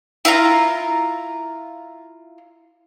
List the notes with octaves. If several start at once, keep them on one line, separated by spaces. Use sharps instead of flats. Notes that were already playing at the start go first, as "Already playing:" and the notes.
E4 F4 F5 A#5